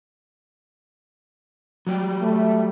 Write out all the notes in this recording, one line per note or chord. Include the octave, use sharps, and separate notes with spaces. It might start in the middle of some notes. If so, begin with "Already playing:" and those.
F#3 G3 G4
A3